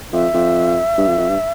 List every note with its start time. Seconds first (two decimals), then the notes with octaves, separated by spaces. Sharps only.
0.13 F2 E5
0.34 F2
0.98 G2
1.08 F2
1.18 F2
1.29 G2